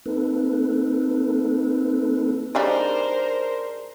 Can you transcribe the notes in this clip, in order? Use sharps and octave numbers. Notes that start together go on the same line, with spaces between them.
A#3 C4 D#4 A4 B4
G3 D4 D#4 G#4 A#4 C5 D5 D#5